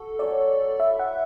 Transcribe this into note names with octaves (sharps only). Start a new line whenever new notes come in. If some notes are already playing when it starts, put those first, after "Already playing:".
Already playing: F#4 A4
F#3 A3 C#4 D5
E4 B4 D5 E5
F#5